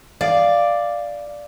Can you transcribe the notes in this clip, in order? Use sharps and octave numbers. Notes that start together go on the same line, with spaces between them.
D5 F5